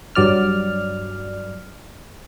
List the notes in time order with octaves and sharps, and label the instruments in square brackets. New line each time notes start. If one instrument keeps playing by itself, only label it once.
[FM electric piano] G2 F#3 D5 F6